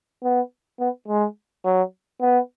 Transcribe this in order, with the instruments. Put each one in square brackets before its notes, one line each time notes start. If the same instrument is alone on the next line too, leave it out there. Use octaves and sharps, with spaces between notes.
[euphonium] B3
B3
G#3
F#3
B3